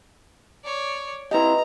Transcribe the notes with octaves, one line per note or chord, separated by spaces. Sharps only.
C#5 D5
E4 G4 B4 D#5 A#5